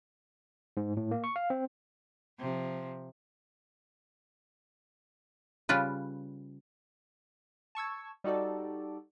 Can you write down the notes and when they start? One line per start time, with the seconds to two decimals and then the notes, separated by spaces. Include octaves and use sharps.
0.77 G#2
0.97 A2
1.11 A#3
1.24 C#6
1.36 F5
1.50 C4
2.39 C3 F3
5.69 C#3 G3 F4 B4
7.75 A5 C#6 E6 G#6
8.24 G3 D#4 F#4 A4 D5